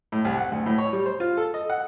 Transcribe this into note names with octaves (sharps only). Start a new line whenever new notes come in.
A2
C2
F#5
D2
A2
C#5
G3
C5
F4
A4
D#5
F#5